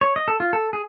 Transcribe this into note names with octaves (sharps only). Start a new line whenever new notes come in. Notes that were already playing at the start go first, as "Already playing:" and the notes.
C#5
D#5
A4
F4
A4
G#4